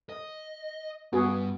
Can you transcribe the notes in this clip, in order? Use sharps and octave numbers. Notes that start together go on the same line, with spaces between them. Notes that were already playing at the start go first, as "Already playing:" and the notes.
D#5
G2 B3 F#4 G#4